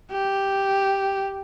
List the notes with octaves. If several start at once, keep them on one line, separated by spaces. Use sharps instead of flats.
G4